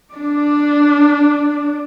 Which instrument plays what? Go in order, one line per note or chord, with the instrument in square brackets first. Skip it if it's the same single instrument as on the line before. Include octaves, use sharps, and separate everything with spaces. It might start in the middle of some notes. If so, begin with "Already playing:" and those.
[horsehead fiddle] D4 D5